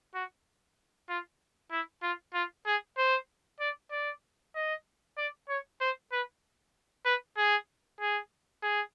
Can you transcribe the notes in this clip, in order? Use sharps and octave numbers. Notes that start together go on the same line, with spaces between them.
F#4
F4
E4
F4
F4
G#4
C5
D5
D5
D#5
D5
C#5
C5
B4
B4
G#4
G#4
G#4